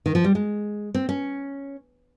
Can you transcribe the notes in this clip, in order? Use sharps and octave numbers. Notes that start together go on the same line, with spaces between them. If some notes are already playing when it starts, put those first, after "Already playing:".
D#3
F3
G3
G#3
C4
C#4